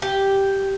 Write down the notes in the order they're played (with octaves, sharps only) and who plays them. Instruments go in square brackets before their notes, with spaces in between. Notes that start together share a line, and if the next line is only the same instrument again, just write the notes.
[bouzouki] G4